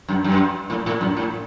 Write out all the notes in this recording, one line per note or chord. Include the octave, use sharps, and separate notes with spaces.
F#2
F#2
A2
A2
F#2
A2